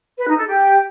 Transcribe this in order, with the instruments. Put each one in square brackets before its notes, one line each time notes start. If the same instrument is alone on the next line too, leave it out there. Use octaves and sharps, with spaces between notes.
[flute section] B4
D#4
A4
G4